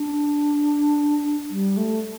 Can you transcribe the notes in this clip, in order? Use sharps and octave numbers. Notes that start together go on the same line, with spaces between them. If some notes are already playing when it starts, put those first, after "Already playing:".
Already playing: D4
G3
A3